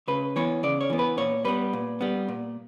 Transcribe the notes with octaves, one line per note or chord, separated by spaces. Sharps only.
C#3 B4
E3 B3 C#5
C#3 D5
C#5
E3 B3
B4
A#2 C#5
G3 B3 B4
A#2
G3 B3
A#2